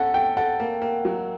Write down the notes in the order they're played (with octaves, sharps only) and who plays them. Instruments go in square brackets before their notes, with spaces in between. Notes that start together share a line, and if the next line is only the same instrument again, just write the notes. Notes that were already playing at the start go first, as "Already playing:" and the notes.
Already playing: [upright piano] C#4 A4 [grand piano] F#5
[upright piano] A4 [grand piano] G5
[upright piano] A4 [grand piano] F#5
[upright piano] A#3
A#3
F#3